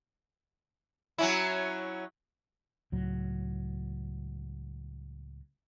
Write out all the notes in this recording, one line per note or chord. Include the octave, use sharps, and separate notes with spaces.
F#3 C#4 E4
C#2 A2 F#3